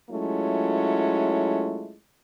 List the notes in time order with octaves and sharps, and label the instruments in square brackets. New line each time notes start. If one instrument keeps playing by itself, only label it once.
[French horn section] F#3 G#3 A3 C#4 E4 F4